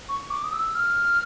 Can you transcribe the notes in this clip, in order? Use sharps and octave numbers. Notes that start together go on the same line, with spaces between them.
C#6
D6
D#6
E6
F6